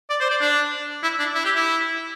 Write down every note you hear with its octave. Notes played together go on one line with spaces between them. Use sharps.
D5
C5
D5
D4
E4
D4
E4
G4
E4